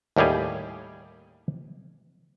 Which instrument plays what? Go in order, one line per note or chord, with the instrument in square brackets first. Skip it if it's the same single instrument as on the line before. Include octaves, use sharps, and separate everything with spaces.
[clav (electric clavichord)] D#2 A2 G3 G4 G#4